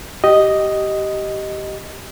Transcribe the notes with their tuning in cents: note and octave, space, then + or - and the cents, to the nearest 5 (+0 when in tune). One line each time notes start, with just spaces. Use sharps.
G4 -15 D#5 +0